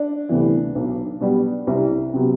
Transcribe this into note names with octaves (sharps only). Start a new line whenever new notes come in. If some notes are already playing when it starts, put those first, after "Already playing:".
Already playing: D4
D2 C3 E3 B3
B1
B2 G3 B3
C2
C3 F#3 B3